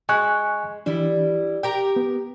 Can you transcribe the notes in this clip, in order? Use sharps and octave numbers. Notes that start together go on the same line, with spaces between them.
G#3 G#5 C#6 F#6
E3 G3 D4 E4
G4 A#4 G5 A#5
B3